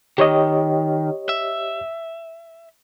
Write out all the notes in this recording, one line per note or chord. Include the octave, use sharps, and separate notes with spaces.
D#3 G4 C#5 D#5
E5